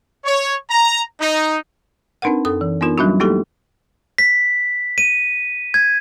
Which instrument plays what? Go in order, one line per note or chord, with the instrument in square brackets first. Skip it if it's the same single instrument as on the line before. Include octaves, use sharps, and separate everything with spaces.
[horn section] C#5
A#5
D#4
[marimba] C4 D4 D#4 A#4 B4 F#5
F#2 A4 D#6
E3
B3 D4 D#4 F4 A#4
F#3 G3 C#4 D4 E4 F#4
A3 A#3 D#4 E4 G4 A4
[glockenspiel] B6
D#7
G#6